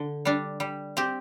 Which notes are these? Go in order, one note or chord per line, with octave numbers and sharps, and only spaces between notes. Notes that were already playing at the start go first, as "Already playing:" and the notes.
Already playing: D3
G3 D4
G3
C4 G4